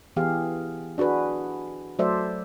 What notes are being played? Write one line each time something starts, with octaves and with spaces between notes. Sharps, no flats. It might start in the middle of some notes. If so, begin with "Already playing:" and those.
E3 B3 G4 G#4 F5
D4 F#4 G#4 B4
F#3 A3 A4 C5 D5 E5